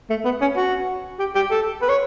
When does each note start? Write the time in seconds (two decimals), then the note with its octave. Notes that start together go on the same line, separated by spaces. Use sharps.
0.10 A3
0.25 B3
0.41 C#4
0.56 F#4
1.19 G4
1.35 G4
1.51 A4
1.82 B4
1.89 C#5